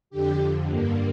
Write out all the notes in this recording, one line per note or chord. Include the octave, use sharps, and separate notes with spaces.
F2 D3 G4
F2 D3
G2 D3 A#3